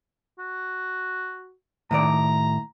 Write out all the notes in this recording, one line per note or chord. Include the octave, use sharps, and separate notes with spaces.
F#4
A2 D#3 D5 A#5